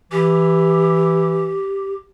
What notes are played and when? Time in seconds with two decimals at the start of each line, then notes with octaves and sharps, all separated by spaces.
0.12 E3 G4